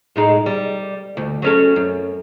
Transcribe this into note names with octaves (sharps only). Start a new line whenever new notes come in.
A2 G#3 D#4
G3
D2
F#3 C#4 A4
F#2